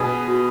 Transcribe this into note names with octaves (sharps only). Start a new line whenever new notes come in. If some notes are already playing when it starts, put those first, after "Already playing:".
Already playing: B2 B3 G#4 B4
F#4